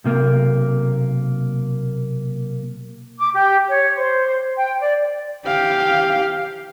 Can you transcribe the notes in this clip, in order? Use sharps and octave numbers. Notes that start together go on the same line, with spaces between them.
B1 C3 A#3
D6
G4
C#5
C5
G5
D5
G4 F5